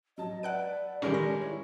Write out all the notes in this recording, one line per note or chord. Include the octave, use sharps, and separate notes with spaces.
F#3 D#5 A5
B4 D5 E5 F#5 A5 F#6 D7
D#3 G3 G#3 C#4 A4 A#4
A#6
E4 C#5